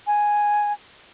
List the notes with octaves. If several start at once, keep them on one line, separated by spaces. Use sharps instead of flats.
G#5